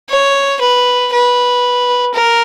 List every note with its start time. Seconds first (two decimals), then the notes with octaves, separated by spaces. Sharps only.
0.10 C#5
0.61 B4
1.13 B4
2.14 A#4